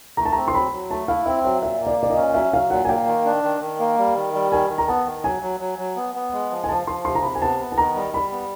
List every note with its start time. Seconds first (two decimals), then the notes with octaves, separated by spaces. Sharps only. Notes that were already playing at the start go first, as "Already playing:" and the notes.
0.17 A3 A#5
0.25 A5
0.32 C4 A#5
0.48 C6
0.54 F#3 B5
0.72 F#3
0.90 A3 A5
1.08 E4 F5
1.26 C4 E5
1.44 F#3 E5
1.62 A#2 E5
1.80 A#3
1.87 D5
1.99 A#2 D5
2.10 D#5
2.16 C#4
2.34 F#3 E5
2.53 F#3 F5
2.70 A#2 F#5
2.85 G#5
2.89 A#3 G5
3.07 D#3
3.25 D4
3.44 D#3
3.61 D#3
3.79 A#3
3.98 G3
4.16 D#3
4.34 G3
4.52 D#3 G#5
4.70 D#3
4.78 A#5
4.88 B3 A5
5.06 D#3
5.24 F#3 G#5
5.42 F#3
5.60 F#3
5.78 F#3
5.96 B3
6.15 B3
6.33 G#3
6.51 F3
6.64 G#5
6.69 F3 A5
6.87 F3 C6
7.05 C3 C6
7.15 A#5
7.23 C3 B5
7.35 G#5
7.41 B3 A5
7.60 B3
7.72 A5
7.77 D#3 A#5
7.96 G3
8.13 G3 B5
8.32 B3